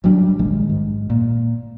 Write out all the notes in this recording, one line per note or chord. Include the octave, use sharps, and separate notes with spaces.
G#1 F#3 G3 D4
A#1 D#3 G#3
G#2
A#2